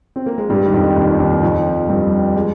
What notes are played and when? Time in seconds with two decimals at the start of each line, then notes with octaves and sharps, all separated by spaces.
0.16 C4
0.26 A#3
0.38 G#3
0.50 G2 G3
0.66 D#3
0.73 F2 F3
0.96 D#2 D#3
1.19 D#2 D#3
1.43 F2 F3
1.89 G2 G3
2.36 G#3